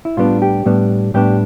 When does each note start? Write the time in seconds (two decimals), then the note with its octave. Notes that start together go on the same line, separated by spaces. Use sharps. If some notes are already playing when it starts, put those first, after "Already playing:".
0.05 E4
0.17 A2 G3 B3 D4 F4
0.42 G4
0.66 A2 G3 B3 D4
1.14 A2 G3 B3 D4 G4